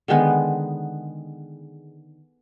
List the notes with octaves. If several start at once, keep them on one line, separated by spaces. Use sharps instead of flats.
D3 D#3 G#3 B3